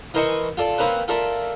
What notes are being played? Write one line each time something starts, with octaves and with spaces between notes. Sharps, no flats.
E3 A#4 C5 D#5 G#5 C#6
F4 A4 D5 A5
A#3 C4 C#4 A#4 B4
F4 A4 A#4 D5 E5